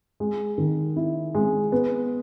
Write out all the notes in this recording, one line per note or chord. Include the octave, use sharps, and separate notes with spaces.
G#3
D#3
E4
G#3
B3